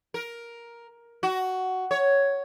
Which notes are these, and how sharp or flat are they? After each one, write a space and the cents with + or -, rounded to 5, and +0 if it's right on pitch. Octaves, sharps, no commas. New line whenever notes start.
A#4 +10
F#4 +10
C#5 +5